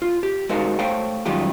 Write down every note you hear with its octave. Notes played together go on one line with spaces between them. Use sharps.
F4
G4
G#3 D#4 F#4 A#4 C5 F5
A3 C5 C#5 F5 G5
F#2 D#3 G3 G#3 F4 G4